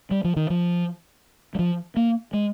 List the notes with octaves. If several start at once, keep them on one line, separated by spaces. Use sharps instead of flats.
G3
F3
D#3
F3
G3
F3
A#3
G#3